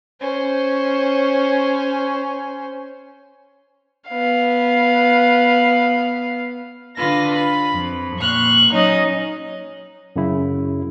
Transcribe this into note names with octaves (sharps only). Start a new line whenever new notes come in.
C#4 C5
B3 F5
D3 F4 B4 A#6
B5
F2
A#2 C#6 F6 F#6
F#3 C#4 D#4 D#5
F#2 C#3 E4